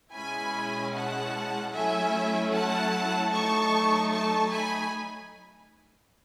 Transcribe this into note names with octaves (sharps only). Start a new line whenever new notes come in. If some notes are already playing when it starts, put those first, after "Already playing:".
B2 G#3 C#4 E4 G#5 B5
F#5 A5
F#3 A3 C#4 E4 E5 G#5
F#5 A5
F#3 A3 D#4 A5 C#6
A5 C#6
G#5 B5